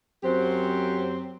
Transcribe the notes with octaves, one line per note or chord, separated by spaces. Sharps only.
F#2 F#3 C4 G4 C5